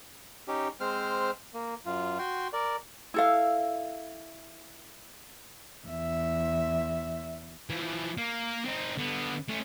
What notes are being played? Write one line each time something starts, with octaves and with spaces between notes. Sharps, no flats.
C#4 D#4 G4
G#3 C4 C5 F6
A#3
F#2 F4
F#4 G5 C6
A#4 D5
E4 A4 F5
E2 E5
E3 F3
A#3
C4 D#4
D3 B3
A3 C#4